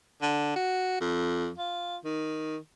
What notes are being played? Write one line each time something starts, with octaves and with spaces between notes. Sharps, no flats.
D3
F#4
F2
F4
D#3